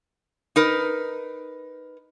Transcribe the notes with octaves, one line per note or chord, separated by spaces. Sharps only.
D#4 A#4 B4